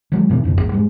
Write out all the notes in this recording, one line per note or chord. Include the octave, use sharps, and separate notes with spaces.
D#3 F#3 G#3
G#2 B2 D#3 C#4
D1 F2 G#2 C#3
A1 D#2 G#2
G#2 G3 G#3